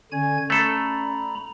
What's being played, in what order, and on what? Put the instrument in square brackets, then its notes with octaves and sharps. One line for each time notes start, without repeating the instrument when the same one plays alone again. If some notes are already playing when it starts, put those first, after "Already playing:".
[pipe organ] D3 G#5 G#6 [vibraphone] C#4 D5
[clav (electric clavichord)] A3 A4 [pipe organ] A#5 B5